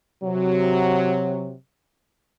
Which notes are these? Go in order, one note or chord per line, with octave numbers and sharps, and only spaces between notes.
C3 F#3